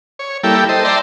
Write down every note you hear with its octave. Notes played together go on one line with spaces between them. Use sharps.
C#5
G3 A#3 E4 A4 G5
A4 C5 D#5
D5 E5 G5 A5 A#5 C6